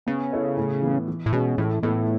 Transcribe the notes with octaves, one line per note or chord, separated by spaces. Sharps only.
C#3 B3
E4 A4 C#5
A2
E3 B3
E3
A2
B2 G#3 C#4 G#4
A2 E3
A2 B3 E4 A4